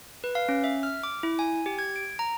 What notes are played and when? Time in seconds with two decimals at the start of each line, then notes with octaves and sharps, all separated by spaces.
0.24 B4
0.35 F5
0.49 C#4
0.64 E5
0.83 F6
1.03 D6
1.23 E4
1.39 G#5
1.66 G4
1.79 G#6
1.96 D7
2.19 A#5